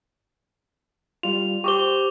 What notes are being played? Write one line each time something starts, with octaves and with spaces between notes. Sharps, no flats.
G3 F4 F7
G4 C5 C#6 D6 G7